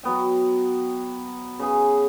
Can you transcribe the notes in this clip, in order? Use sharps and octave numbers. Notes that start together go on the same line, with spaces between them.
F#3 B3 G5
C#3 B3 G#4